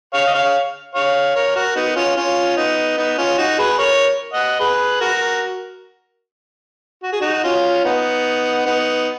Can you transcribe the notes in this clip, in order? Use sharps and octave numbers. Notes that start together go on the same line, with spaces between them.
C#5 F5
D#5
C#5 F5
C#5 F5
A#4 C#5
F#4 A#4
B3 D#4
C#4 F4
C#4 F4
B3 D#4
B3 D#4
C#4 F4
D#4 F#4
G#4 B4
A#4 C#5
D#5 F#5
G#4 B4
F#4 A#4
F#4
G#4
D#4 F#4
F#4
C#4 F4
B3 D#4
B3 D#4